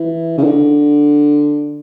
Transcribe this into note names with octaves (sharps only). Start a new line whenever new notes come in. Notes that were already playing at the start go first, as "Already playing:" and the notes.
Already playing: E3
C#3
D3